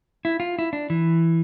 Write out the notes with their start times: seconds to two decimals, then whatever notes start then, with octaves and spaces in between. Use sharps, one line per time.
0.25 E4
0.40 F4
0.59 E4
0.73 D4
0.90 E3